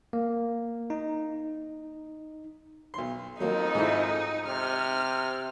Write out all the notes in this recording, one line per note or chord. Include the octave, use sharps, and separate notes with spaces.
A#3
D#4
B1 C6
F2 F#3 A#3 D#4
G#2 A3 E4
C3 F6